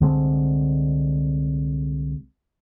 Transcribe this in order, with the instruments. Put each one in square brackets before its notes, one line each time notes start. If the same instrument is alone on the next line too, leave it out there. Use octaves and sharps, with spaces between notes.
[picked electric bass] C2 D3 G#3 C4